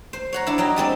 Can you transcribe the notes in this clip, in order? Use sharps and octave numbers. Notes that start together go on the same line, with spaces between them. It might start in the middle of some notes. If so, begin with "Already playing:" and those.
C5
C#5 F#5 A#5
D4 E4
F#3 D#4 G5
G3 G#3 C4 D4